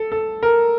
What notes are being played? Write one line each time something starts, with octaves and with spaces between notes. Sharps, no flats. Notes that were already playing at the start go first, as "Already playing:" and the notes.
Already playing: A4
A4
A#4